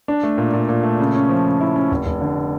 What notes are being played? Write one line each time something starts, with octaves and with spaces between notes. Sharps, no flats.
D4
A3
A#2
A#2
A#2
A3
C#3
C#4
F3
C#3
E4
C#4
F1
F1
D3